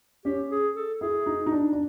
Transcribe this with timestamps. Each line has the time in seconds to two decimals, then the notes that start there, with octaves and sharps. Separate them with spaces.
0.25 C#4 G4
0.51 G#4
0.75 A4
1.00 E4 G#4
1.26 D#4
1.46 D#4
1.52 D4
1.73 D4